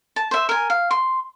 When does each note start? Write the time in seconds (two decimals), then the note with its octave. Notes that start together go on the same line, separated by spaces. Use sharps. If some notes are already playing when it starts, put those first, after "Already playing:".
0.16 A5
0.31 C5 E5
0.49 A#4 G#5
0.70 F5
0.91 C6